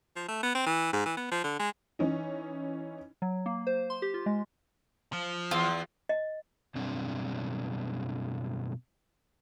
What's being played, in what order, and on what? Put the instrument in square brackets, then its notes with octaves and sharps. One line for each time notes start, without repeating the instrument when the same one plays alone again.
[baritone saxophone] F3
A3
B3
C4
E3
G#2
E3
B3
F3
D3
G#3
[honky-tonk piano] E3 C#4 D#4
[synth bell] F#3
A#3
C5
C6
G4
F4
G#3
[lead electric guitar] F3
[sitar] E2 [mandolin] F4
[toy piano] D#5
[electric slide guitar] F#2 B2 G3 C4 D4